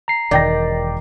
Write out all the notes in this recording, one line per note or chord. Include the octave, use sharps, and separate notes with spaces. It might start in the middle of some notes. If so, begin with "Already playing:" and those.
A#5 C7
E1 D#3 D5 G5 A#6